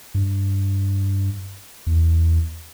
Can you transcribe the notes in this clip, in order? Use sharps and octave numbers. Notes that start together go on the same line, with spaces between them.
G2
E2